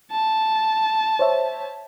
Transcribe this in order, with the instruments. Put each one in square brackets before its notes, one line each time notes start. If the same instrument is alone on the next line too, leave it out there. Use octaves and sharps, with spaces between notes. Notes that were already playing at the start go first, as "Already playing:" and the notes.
[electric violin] A5
[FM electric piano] C5 C#5 E5